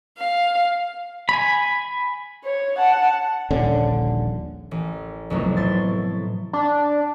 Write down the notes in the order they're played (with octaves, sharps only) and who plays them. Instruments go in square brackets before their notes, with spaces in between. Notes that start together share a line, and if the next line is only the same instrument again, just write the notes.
[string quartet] F5
[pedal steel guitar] G#5 B5
[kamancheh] C#5
F#5 A5
[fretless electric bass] D#1 A#1 D3 C#4
[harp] A1
F1 B1 F#3 A3 E4
A2 E4 C6 A6
[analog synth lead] D4